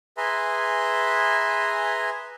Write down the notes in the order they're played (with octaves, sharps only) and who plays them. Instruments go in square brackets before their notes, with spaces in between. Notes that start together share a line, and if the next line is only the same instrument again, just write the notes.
[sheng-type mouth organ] G#4 B4 E5 G#5 A#5 C6